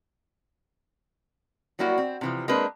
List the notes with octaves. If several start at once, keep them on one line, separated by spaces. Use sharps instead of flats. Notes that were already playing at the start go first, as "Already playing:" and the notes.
F#3 G3 A#3 E4 F#4
C4
C3 E3 F3
G#3 A#3 C4 D4 A#4 B4